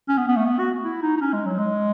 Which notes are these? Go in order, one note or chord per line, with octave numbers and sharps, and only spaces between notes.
C#4
B3
B3
A3
B3
F#4
E4
D#4
D#4
C#4
G#3
F#3
G#3